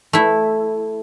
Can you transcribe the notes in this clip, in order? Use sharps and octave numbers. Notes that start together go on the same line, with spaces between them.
A3 E4